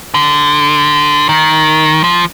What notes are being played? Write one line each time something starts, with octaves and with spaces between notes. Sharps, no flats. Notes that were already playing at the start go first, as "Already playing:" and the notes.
D3
D#3
F3